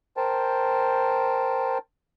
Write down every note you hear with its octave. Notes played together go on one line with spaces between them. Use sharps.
A#4 C5 G5 A5